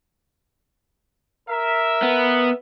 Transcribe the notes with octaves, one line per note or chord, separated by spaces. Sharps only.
A#4 E5
B3